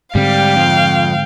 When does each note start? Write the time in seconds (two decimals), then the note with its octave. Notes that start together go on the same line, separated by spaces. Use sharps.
0.15 G#2 D3 G3 C4 F5 G5
0.56 F2